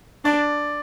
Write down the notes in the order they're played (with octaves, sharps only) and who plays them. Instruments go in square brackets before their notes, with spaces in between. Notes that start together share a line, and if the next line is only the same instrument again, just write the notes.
[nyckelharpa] D4 [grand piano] D5